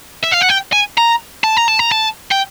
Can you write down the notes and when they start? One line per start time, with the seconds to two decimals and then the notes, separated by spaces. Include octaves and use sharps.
0.24 E5
0.32 F5
0.42 F#5
0.50 G5
0.73 G#5
0.97 A#5
1.44 A5
1.57 A#5
1.68 A5
1.79 A#5
1.92 A5
2.31 G5